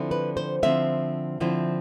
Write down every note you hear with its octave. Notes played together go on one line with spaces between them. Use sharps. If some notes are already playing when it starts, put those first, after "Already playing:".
Already playing: D3 F3 C4 E4
B4
C5
D3 F3 C4 E4 E5
D3 F3 C4 E4